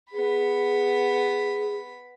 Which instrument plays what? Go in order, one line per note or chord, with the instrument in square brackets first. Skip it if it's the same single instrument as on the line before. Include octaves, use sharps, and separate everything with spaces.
[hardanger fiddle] B3 B5 [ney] G#4